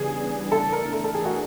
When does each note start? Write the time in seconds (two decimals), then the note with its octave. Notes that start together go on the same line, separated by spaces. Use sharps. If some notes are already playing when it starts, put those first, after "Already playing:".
Already playing: C#3 E3 G3 B3 D4 G#4
0.52 E3 A3 D4 A4
0.73 A#4
0.93 A4
1.04 A4
1.15 G#4
1.25 F#4